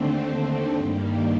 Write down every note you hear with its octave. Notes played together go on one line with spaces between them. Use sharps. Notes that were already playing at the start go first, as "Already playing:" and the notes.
Already playing: D#2 D3 A3 C4
G2 D#3 G3 A#3